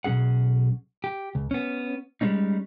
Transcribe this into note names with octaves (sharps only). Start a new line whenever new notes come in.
B1 G2 C#4 G#4 F#5
G4
C#2
B3 C#4
G3 G#3 C4 C#4 D#4